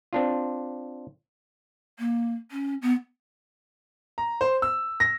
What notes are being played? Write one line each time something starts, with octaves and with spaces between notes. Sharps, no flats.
C4 D4 F4
A#3
C#4
B3
A#5
C5
E6
A#6